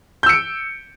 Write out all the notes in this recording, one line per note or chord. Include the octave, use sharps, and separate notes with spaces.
E6 G6 C#7 D7